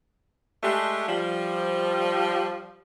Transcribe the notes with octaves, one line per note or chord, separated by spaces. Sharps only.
G#3 A3 D4 G4
F3 G3